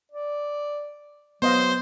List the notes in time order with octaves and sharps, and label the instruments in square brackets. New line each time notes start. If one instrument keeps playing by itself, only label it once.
[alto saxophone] D5
[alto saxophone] F#3 [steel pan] B3 D#5 F5 [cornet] C5